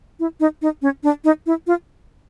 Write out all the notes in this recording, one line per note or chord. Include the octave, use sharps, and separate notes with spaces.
E4
D#4
D#4
C#4
D4
D#4
E4
F4